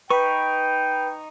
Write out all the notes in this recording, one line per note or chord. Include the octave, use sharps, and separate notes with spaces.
D#4 B4 G5 B5 C#6